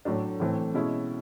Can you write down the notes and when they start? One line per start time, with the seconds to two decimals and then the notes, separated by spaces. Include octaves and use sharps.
0.05 A2 F#3 A3 D4
0.40 A2 E3 A3 C4
0.74 B2 G#3 C#4 E4